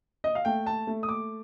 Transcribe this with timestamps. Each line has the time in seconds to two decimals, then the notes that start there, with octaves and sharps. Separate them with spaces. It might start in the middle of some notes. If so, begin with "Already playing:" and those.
0.24 D#5
0.35 F5
0.45 A3 G5
0.66 A5
0.87 A3
1.03 D#6
1.09 D6